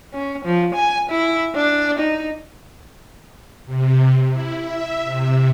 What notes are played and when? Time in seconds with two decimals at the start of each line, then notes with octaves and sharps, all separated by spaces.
0.14 C#4
0.45 F3
0.75 G#5
1.10 E4
1.56 D4
1.99 D#4
3.66 C3
4.31 E4
4.60 E5
5.04 C3